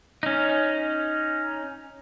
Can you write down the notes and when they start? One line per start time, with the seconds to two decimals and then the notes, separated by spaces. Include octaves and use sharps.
0.23 C#4 D#4